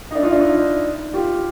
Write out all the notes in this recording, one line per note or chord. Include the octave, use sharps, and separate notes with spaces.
D#4
D4 E4
D#4 F4
D4 E4
D#4 F4
F4 G4